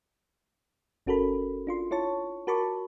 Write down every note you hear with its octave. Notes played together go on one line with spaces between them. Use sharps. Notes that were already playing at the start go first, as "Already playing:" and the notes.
G1 C#4 F#4 A4 A#4 B5
D4 F4 C6
E4 F4 C#5 A5 C#6
F#4 A#4 A5 B5 C#6 D6